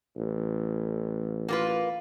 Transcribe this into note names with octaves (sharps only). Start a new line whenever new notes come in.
A1
A#3 F4 B4